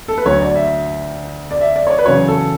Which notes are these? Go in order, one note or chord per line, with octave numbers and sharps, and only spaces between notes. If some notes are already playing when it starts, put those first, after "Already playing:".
A4
B4
D2 D3 F#3 C#5
D5
E5
D5
E5
D5
C#5
D5
B4
E2 C#3 F#3 C#5
A4